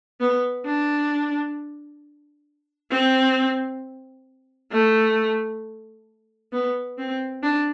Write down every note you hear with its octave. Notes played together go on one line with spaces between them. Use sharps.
B3
D4
C4
A3
B3
C4
D4